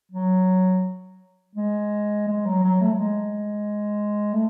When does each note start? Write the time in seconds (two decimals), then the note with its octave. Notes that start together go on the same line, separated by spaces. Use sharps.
0.12 F#3
1.55 G#3
2.28 G#3
2.46 F#3
2.63 F#3
2.81 A3
2.93 F#3
2.99 G#3
4.33 A3